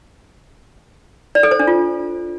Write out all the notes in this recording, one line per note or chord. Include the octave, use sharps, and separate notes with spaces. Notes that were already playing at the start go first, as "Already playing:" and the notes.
D5
A4
C5
D4
F4